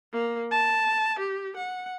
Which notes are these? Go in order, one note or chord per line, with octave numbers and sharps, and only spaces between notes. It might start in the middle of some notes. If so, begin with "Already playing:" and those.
A#3
A5
G4
F#5